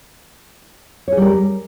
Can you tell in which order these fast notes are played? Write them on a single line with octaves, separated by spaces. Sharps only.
C#5 G#4 G3 A#4